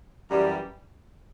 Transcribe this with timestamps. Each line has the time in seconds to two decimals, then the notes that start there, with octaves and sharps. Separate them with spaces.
0.30 F#2 E3 G3